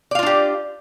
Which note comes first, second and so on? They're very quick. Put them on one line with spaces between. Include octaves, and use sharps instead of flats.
D5 F5 F4 D4 G4